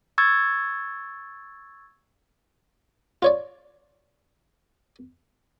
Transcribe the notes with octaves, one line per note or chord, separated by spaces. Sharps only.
C#6 E6 G#6 A6
F4 C#5 D5